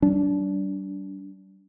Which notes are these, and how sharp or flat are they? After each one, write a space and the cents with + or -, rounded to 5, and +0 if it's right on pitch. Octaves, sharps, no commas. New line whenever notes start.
G3 -35 D4 -25